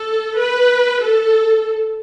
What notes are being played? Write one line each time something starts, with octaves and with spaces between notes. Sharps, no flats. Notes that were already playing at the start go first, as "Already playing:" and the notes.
Already playing: A4
B4
A4